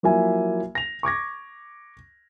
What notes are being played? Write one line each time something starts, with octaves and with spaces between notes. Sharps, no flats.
F3 F#3 A#3 E4 E5 G#5
A#6 F7
C#6 D6 G#6 A#6